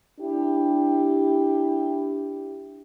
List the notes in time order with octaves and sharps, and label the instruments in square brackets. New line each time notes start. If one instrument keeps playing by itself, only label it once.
[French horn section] D4 E4 G4